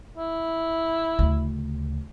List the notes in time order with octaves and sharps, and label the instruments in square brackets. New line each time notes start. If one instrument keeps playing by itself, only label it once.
[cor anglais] E4
[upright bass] D2 C#3